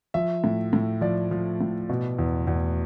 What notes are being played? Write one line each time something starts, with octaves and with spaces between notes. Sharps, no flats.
F3 E5
A2
A2
F3 D5
F3
A2
B2
E2
E2